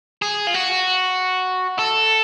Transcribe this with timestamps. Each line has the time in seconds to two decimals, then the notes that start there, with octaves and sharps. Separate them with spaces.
0.22 G#4
0.47 F4
0.54 F#4
1.79 A4